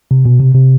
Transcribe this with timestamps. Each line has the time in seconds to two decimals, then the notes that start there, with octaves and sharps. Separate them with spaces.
0.11 C3
0.26 B2
0.40 C3
0.54 C3